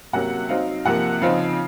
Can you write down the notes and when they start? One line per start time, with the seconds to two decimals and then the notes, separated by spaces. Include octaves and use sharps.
0.13 C3 F#3 A#3 C#4 F#5
0.49 F#3 C4 D#4 F5
0.85 C3 F3 A#3 F#5
1.21 C#3 F3 C4 D#4 F5